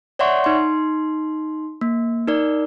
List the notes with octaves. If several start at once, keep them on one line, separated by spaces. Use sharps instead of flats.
C#5 D5 E5 F#5 C6 C#6
D#4 C6
A#3
D#4 A#4 D5